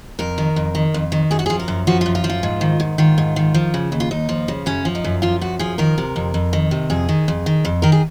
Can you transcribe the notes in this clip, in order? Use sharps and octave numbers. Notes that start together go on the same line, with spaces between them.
F2 A#4
D#3
F2
D#3
F2
D#3
F#2 G#4
F#4
F3 G#4
A#4
F#2
F3 F#4
F#2 F4
F4
F3
F4
G#2
D#3
G#2
D#3 F4
G#2
D#3
F3
C#3
D#2
F4
D#2 D#4
F3
C#3
F#2 C#4
F3
D#4
F#2
F3 F4
F#2 F#4
F3 G#4
D#3 A#4
C3
F2
F2
D#3
C3
F2 G#4
D#3
F2
D#3
F2
D#3 A#4
G#4